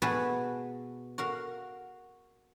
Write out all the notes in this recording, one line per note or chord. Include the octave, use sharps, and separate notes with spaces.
B2 F#4 G#4 B4 G#5 A5
F#4 A#4 F5